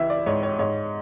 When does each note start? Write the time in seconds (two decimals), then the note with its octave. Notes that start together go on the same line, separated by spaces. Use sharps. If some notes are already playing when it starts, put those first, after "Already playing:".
Already playing: C#2 E3 E5
0.10 D5
0.26 G#2 C#5
0.43 C#5
0.59 G#2 C#5